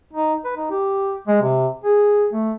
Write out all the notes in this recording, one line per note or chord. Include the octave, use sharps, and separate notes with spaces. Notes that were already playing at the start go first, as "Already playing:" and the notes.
D#4
B4
D#4
G4
G#3
C3
G#4
A3